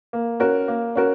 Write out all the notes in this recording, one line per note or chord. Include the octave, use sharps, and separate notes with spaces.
A#3
C#4 F#4 A#4
A#3
C#4 F#4 A#4